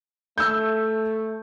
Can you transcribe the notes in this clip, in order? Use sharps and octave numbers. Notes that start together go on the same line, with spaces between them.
A3 E6 G6